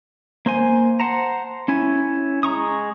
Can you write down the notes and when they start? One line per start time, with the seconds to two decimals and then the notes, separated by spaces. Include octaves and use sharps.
0.46 A#3 C5 G#5
1.00 C5 F#5 A5 A#5
1.68 C#4 E4 G#5
2.43 G#3 A#5 C#6 D#6